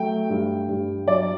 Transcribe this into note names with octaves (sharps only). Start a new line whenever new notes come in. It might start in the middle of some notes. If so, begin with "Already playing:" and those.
Already playing: F#3 A3 G5
G2
G2
F#3 D5